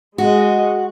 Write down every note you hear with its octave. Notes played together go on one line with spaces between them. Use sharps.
G#3 F#4 D#5